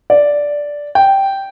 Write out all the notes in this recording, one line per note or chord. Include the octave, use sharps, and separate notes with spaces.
D5
G5